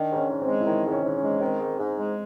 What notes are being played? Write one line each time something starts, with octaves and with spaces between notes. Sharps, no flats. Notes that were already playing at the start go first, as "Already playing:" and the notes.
Already playing: D#3 D4
G#2
C#4
G#2
C4
G#3
E4
D#3 D#4
G#2
C#4
G#2
C#4
G#3
D#3 C4
G#2
G#2
G#3